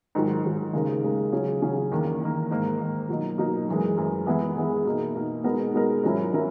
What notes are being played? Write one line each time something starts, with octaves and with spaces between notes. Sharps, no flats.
G#2 D#3 F#3
G#2 D#3 F#3
D#2 C#3 G#3 D#4 A#4
D#2 C#3 G#3 D#4 A#4
C#3 F#3 C#4 G#4
C#3 F#3 C#4 G#4
E2 D#3 A#3
E2 D#3 A#3
G#2 D#3 A#3
G#2 D#3 A#3
B2 F#3 A#3 D#4
B2 F#3 A#3 D#4
F#2 E3 G#3
F#2 E3 G#3
E3 G#3 B3 E4 G#4
E3 G#3 B3 E4 G#4
B2 A#3 D#4
B2 A#3 D#4
B2 G#3 B3 D#4 A#4
B2 G#3 B3 D#4 A#4
G#2 F#3 C#4 E4 A#4
F#3 C#4 E4 A#4